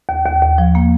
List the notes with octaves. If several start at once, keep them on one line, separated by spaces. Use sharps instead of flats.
D#2
D#2
D#2
F3
A#3